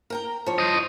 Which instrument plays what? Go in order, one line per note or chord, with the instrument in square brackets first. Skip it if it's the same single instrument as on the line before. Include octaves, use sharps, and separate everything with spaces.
[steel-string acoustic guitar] A#4 G5 A#5
F3 C#5
[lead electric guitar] C5 D#5